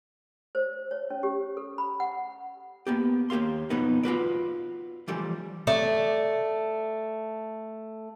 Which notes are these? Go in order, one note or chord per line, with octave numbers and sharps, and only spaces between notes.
C5
C#5
C#4
G4
A4
B5
F#5
A#3 B3 G4
D#2 A#3 G4 F5 C6
F2 B2 B3 D#4
F4 F#4 B4 D5
E3 F3 G3 A3 D5
A3 D5